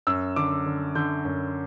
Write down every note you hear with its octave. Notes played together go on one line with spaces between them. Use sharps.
F#2 E6
D3 D6
D3
D3 G6
F#2